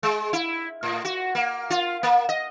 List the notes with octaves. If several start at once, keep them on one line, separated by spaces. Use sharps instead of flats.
G#3
E4
A2
F#4
A#3
F4
A#3
D#5